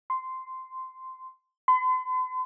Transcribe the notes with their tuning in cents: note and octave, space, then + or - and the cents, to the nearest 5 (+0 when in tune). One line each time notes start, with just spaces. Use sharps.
C6 -10
C6 -45